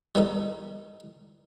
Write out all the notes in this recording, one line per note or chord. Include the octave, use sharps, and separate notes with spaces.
G3 B3 D#4 A4